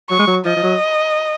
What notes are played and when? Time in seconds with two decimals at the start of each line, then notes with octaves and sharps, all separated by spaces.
0.10 F#3 C#6
0.19 G#3
0.27 F#3
0.45 F3 D#5
0.56 F3
0.63 F#3